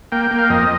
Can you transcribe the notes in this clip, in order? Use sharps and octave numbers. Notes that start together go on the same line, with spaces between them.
A#3 G5
A#3
F5
F2 D#5